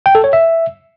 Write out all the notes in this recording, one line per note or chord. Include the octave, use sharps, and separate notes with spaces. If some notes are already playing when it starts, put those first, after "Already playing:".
G5
A4
C#5
E5